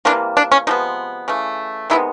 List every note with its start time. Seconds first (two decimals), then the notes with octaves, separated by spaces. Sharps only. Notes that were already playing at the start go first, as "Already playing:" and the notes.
0.05 C3 E3 G3 A#3 D4
0.37 D4
0.52 C#4
0.67 C3 F3 G#3 B3 D#4
1.28 C#3 E3 A3
1.90 C3 D#3 G#3 B3 E4